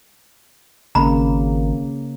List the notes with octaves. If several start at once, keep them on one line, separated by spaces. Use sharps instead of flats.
G#1 C#3 A#3 A#5 B5